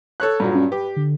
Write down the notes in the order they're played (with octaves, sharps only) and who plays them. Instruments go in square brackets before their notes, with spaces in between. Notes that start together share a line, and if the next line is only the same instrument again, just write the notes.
[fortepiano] A4 C#5 F#6
G2 A#2 F#3
[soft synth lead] C#4
[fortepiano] G4 [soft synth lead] B4
[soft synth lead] D3